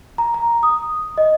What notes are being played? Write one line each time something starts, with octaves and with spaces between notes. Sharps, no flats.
A#5
A#5
D#6
D#5